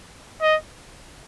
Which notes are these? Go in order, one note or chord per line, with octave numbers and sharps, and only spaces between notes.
D#5